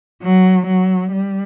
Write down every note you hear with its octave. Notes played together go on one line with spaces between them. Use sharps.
F#3
F#3
G3